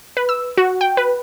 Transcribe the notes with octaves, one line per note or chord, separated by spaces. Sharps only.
B4
E6
F#4
G5
B4